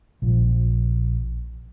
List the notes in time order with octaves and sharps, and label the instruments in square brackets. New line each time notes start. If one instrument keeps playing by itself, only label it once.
[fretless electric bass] A#1 F3